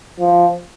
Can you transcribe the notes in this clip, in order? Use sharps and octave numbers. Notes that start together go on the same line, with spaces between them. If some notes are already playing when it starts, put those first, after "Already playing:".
F3